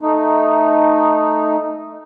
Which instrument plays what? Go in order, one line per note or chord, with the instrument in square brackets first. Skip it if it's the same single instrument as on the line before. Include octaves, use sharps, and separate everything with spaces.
[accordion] A3 D#4